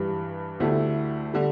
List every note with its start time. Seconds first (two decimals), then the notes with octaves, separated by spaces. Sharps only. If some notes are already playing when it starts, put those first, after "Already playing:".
Already playing: G2 E3 G3
0.60 D2 D3 A3 E4 G4
1.34 D3 G3